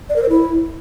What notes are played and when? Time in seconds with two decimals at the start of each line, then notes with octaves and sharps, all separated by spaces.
0.09 D5
0.16 A#4
0.23 C5
0.29 E4